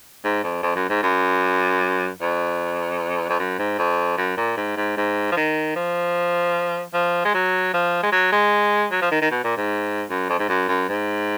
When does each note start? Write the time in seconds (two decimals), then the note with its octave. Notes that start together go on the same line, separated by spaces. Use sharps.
0.24 G#2
0.43 F2
0.63 F2
0.76 F#2
0.89 G#2
1.03 F#2
2.21 F2
3.29 F2
3.39 F#2
3.59 G#2
3.79 F2
4.18 F#2
4.37 A#2
4.57 G#2
4.77 G#2
4.97 G#2
5.32 F3
5.36 D#3
5.76 F3
6.94 F3
7.25 G#3
7.34 F#3
7.74 F3
8.03 G#3
8.12 F#3
8.32 G#3
8.91 F#3
9.02 F3
9.11 D#3
9.21 D#3
9.31 B2
9.44 A#2
9.57 G#2
10.10 F#2
10.29 F2
10.39 G#2
10.49 F#2
10.68 F#2
10.89 G#2